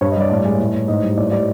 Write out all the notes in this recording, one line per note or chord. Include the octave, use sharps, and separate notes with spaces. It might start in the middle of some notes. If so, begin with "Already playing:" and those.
G2 C#5
D#5
G3 D5
A2 D5
G#3
A2
A2
G#2 D#5
G3
A2 D5
G3 D5